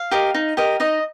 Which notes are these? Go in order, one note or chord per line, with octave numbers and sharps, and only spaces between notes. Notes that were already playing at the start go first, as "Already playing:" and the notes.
Already playing: F5
G4 A#4 D#5
D#4
G4 A#4 D#5
D#4 D#5